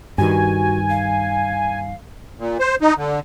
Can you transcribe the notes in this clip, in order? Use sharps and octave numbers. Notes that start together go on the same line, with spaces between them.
G2 D#3 F#4 G#5
F5
A#2
C5
D#4
D3